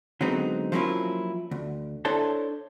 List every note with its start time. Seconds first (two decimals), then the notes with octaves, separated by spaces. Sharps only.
0.21 D3 F#3 G#3 B3 C4 D#4
0.72 F3 F#3 A#3 C#4 E4 F4
1.51 D2
2.05 D4 E4 A4 C5 C#5 A5